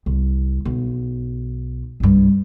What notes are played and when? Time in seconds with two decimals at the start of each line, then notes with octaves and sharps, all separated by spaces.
0.06 C2
0.65 B1
2.00 C2 G2